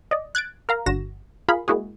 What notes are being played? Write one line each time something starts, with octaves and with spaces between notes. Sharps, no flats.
D5 D#5
F#6 G#6 A6 D7
A#4 F5 A#5
G1 D3 F#4 A#6 E7
F4 G#4 A#4 F5 B5
G#3 A#3 E4 F#4 G#4